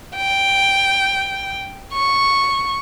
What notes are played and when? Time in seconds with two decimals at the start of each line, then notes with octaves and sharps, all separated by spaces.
0.16 G5
1.93 C#6